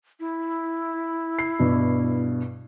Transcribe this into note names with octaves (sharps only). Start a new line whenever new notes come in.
E4
C7
G2 B2